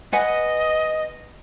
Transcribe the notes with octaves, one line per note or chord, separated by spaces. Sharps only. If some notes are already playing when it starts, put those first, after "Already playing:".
B4 D#5 F#5 G#5